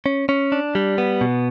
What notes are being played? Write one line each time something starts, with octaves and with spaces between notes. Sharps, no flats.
C#4
C#4
D4
G3
B3
B2